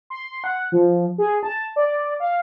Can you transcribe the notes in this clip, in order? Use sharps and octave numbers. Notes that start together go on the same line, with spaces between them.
C6
F#5
F3
G#4
A5
D5
F5